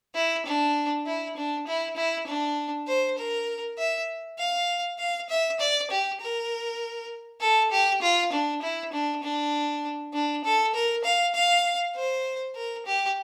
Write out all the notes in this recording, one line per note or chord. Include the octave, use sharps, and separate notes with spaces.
E4
D4
E4
D4
E4
E4
D4
C5
A#4
E5
F5
F5
E5
D5
G4
A#4
A4
G4
F4
D4
E4
D4
D4
D4
A4
A#4
F5
F5
C5
A#4
G4